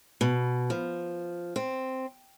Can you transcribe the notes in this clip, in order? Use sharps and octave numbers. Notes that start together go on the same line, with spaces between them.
B2
F3
C4